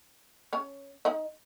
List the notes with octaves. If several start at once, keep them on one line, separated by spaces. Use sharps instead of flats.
C#4 C#5
D#4 D#5